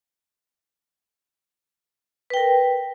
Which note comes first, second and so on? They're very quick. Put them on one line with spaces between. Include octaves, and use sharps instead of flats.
B4 G5 A#4